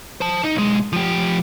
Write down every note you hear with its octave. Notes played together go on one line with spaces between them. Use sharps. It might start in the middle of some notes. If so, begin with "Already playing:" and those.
C5 A5
D#4
B1 G#3
F3 G4